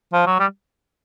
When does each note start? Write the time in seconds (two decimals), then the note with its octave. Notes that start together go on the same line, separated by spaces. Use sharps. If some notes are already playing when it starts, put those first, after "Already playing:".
0.13 F3
0.26 F#3
0.40 G3